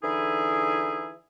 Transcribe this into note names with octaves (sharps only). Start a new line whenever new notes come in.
D3 E3 D#4 E4 G#4